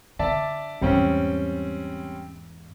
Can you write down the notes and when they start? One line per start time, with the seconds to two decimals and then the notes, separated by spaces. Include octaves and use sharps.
0.19 D3 D5 E5 A5
0.81 E2 G#2 G3 C4 C#4